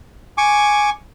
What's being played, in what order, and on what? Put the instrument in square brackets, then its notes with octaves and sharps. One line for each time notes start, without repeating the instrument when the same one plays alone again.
[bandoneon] G#5 C#6 D6